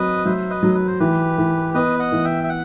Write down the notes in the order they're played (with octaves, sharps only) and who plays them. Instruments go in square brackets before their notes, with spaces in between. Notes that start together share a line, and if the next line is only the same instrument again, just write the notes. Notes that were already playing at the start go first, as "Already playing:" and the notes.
Already playing: [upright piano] F#3 C4 [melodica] B4 D#5
[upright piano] F#3 [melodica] C5 E5
[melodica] B4 D#5
[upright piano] F#3
[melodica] B4
C5
[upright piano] E3 [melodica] G4 B4
[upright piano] E3
[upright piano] B3 [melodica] B4 D#5
[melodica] D#5 F#5
[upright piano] E3
[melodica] E5 G5
E5
F#5